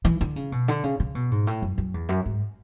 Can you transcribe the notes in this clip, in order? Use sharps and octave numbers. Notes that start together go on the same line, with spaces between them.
E3
D3
C#3
B2
D3
C#3
C#3
B2
G#2
A2
F#2
F#2
E2
F#2
G#2